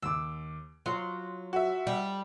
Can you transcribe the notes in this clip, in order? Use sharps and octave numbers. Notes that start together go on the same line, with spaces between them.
D#2 D6 E6
F#3 F4 C6
F#4 E5
G3